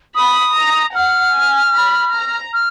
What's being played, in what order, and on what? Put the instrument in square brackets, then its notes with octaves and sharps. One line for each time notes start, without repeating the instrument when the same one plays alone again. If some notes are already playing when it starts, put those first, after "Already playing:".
[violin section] B5 [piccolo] D#6
[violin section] A#5
[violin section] F#5 [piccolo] F6
[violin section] G#5
B5
A#5
[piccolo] F6